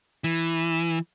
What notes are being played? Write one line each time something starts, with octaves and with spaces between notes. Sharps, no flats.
E3